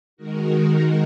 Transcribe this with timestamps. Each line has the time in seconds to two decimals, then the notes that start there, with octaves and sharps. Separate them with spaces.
0.17 D#3 G#3 D#4 F#4 A#4